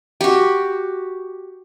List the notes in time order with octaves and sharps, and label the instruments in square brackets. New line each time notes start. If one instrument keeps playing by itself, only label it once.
[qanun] F#4 G4